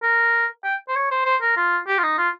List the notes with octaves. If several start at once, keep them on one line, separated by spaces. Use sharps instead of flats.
A#4
G5
C5
C#5
C5
C5
A#4
F4
G4
F4
D#4
F4